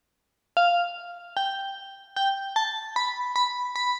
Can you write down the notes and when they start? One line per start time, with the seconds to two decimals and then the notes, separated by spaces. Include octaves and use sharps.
0.57 F5
1.37 G5
2.16 G5
2.56 A5
2.96 B5
3.36 B5
3.76 B5